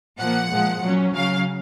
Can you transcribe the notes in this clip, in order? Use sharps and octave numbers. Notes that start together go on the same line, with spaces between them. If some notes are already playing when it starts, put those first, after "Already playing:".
A#2 F3 A#3 F#5
A#2 F3 G#3
A#2 F#3 C#4
C#3 F#3 C#4 F5